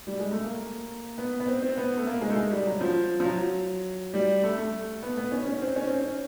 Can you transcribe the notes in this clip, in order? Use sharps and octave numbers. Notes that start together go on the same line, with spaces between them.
G3
G#3
A3
A#3
B3
B3
C4
C4
B3
A3
A#3
G#3
A3
G#3
G3
F#3
F3
F3
F#3
G3
A3
A3
B3
B3
C#4
C#4
C4
C#4
C4
C#4